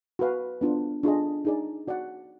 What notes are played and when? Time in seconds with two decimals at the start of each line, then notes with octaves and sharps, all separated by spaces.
0.19 F#4 B4 F5
0.61 B3 D4 F4
1.03 D4 F4 G#4 D#5
1.45 D#4 G#4 D5
1.88 F#4 D5 F#5